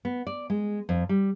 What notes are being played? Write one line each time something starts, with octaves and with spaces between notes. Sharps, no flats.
B3
D5
G#3
F2
G3